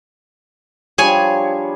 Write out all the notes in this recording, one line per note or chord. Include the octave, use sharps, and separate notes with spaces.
F3 G3 D4 G#4 C#5 G#5